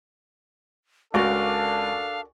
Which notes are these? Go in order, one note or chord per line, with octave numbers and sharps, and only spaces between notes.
C#2 D4 F#4 A4 A#4 D5 F5